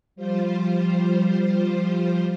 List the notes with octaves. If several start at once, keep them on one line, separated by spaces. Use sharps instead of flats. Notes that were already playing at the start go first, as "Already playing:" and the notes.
F3 G3 F4 C5